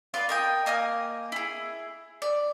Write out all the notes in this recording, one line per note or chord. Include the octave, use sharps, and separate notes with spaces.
F4 B4 D5 F5
A#4 D#5 G5
A#3 D#5 G#5 F6
E4 G#4
D5